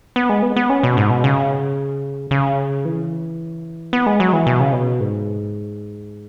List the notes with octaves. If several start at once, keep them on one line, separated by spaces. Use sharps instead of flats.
B3
G#3
B3
B3
C#4
B2
G#2
B2
C#3
C#3
E3
B3
G#3
F#3
E3
B2
C#3
B2
G#2